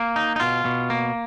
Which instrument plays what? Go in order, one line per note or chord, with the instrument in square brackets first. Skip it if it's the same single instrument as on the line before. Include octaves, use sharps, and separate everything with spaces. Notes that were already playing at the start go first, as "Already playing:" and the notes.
Already playing: [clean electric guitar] A#3
D#4
D#4
B2 F4
B2
A#3